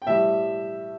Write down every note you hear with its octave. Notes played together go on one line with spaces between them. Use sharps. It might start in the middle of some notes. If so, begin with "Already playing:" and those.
G5
A2 G3 E5